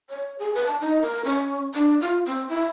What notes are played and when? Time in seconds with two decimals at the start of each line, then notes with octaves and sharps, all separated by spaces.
0.09 C#5
0.39 G#4
0.54 B4
0.66 A5
0.81 D#4
1.02 A#4
1.25 C#4
1.74 D4
2.01 F4
2.26 C4
2.49 E4